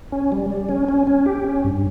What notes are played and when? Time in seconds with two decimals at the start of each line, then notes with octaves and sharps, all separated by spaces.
0.12 C#4
0.32 G3
0.50 G3
0.69 C#4
0.89 C#4
1.07 C#4
1.26 G4
1.44 C#4
1.64 G2